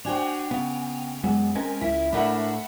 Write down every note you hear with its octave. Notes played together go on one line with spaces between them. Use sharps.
D4 F#4 C5 G5 G#5 F7
C#3 B3
F#2 F#3 G#3 B3
G#3 C4 C#4 A#4 G#5
C#2 E4 B6
A2 A3 D4 A#4 E5 F#5 B5